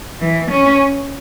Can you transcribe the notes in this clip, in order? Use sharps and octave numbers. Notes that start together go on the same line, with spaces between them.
E3
C#4